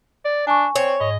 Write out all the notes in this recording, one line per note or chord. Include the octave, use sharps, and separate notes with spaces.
D5
D4 G#5 C#6
C4 C#5
G#2 D#5